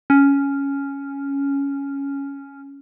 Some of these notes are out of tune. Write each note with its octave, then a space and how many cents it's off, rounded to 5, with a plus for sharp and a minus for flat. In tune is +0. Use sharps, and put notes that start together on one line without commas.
C#4 +5